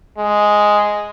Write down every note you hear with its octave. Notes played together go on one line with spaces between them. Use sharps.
G#3